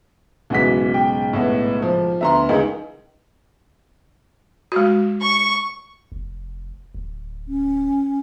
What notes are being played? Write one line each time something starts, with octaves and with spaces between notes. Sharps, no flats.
B1 G#2 C#3 E3 F#4 B6
G5
A2 B3
F3
D2 B3 E5 A#5 C6
C#2 D#3 E3 D#5
G#3 F#4
C#6
F1
D1
C#4